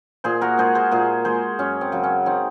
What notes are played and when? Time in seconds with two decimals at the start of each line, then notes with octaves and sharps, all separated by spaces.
0.24 A#2 G#4 C5
0.41 F#4 A#4
0.58 G#3 G#4 C5
0.75 G#4 C5
0.91 A#2 G#4 C5
1.25 G#3 G#4 C5
1.59 F#2 C#4
1.81 C4
1.92 C#3 F#3
2.03 C#4
2.26 C4 D#4